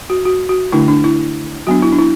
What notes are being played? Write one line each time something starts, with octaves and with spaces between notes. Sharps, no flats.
F#4
F#4
F#4
D3 A3 D4 E4
D4
E4
F#3 B3 D4 F#4
E4
D4
E4